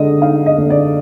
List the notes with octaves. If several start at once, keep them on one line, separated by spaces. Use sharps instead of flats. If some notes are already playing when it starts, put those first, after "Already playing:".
Already playing: D3 G#3 D#5
D#4 F5
D#5
D3
D5